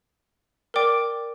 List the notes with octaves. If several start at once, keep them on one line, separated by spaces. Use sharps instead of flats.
A#4 D5 G5 D6